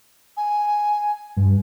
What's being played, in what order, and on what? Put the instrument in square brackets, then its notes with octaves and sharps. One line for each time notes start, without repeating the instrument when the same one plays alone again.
[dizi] G#5
[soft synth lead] G2